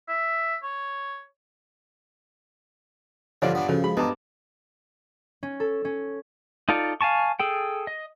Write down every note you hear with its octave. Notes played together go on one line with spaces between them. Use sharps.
E5
C#5
G2 D3 F3 D4 F4 C#5 D5
B3 D4
C#3 F3 F#4 A4
G#3 F5 B5
G2 B3 D#4 B4 A5 D6
C#4
A4
C#4
D#4 F4 A4 D5
F5 G#5 A5 C#6
G#4 A4 G5
D#5